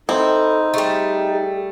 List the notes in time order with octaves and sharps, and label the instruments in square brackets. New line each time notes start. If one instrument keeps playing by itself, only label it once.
[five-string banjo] C4 [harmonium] D#4 [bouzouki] E4 [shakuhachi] A4
[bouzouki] G3 A3 [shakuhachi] G#4